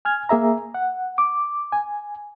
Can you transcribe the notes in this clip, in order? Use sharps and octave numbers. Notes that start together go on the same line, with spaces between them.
G#5 F6 G#6
A#3 G#4 E5 A#5
F#5
D6
G#5